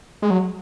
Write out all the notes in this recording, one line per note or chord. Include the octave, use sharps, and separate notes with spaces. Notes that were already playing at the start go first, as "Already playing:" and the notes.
G#3
F#3